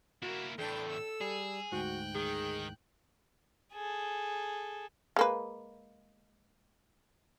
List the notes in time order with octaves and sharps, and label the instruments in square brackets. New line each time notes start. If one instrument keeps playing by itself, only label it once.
[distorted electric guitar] A#3 E4 [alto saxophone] F#4 [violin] A#4
[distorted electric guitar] E2 A2 [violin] D4 G5 [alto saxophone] A4
[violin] E6
[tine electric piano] G3 [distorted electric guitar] G#4
[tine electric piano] D2 G#2 [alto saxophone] F#4 [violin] G5 F#6
[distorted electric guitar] D#3 [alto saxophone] G#4
[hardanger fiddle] G#4 A4
[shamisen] G#3 A#3 B4